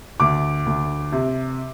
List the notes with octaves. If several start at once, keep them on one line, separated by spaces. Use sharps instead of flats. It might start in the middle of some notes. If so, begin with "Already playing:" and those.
D2 D6
D2
C3